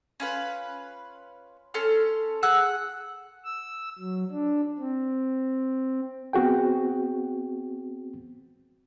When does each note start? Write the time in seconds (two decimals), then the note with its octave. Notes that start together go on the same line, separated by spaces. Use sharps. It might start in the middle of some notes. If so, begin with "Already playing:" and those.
0.20 C#4 F4 B4
1.74 C#4 A4 C6 F6
2.43 G#4 F#5 E6 F#6
3.45 E6
3.99 F#3
4.31 D4
4.78 C4
6.33 B3 C4 F#4 G#4 G5